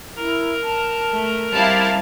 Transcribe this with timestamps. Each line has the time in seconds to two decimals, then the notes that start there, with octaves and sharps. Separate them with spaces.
0.16 E4 A#4 A#5
0.63 A5
1.11 A3
1.53 G3 C4 E4 G4 F5 A5